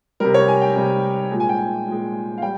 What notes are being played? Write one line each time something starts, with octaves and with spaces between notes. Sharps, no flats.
C3 G3 A#4
C#5
G#5
G5
C3 G3
A#2 G#3
G#5
G5
G#5
A#2 G#3
F5
G3 G5